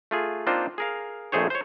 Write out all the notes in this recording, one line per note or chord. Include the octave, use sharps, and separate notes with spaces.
A3 F4 G#4
A#3 C4 D4 D#4 F4 C5
G#4 A#4 F5
A#1 F2 A3 G#4 C5 C#5
C5 C#5